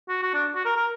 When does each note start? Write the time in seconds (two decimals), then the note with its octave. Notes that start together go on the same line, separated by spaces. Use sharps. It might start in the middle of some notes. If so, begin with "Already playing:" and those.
0.08 F#4
0.23 F#4
0.34 D4
0.55 F#4
0.65 A#4
0.76 A#4